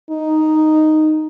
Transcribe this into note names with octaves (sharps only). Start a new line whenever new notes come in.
D#4